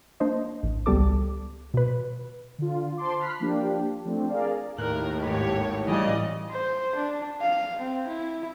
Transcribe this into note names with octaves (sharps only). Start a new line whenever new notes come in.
A#3 D4 C5 D#5
A1
C#2 G3 B3 A4 D6
B2 B4
D3 F4
C5 A5 C6 D6
B5 F6 F#6 B6 C7
F3 A#3 D4 G4
F3 A3 C4 D4
G#4 A#4 D5 F5
D#2 A2 A#4 F#6
G#1 G4 B4 C#5
C#2 A#2 C#3 E3 G3 D5 D#5
C5
D4
F5
C4
E4